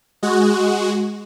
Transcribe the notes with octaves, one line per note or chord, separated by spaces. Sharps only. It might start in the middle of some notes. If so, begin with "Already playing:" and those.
G#3 F#4